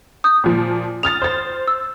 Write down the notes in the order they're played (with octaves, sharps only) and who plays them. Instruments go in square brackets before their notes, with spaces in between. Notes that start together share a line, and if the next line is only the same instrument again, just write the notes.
[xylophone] D#6 G6
[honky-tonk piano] A#2 F3
[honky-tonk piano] D#6 F6 A6 [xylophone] F7
[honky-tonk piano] C5 A6
[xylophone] E6